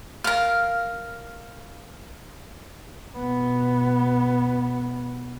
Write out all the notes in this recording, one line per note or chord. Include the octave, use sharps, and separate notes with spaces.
A#4 F5
B2 B3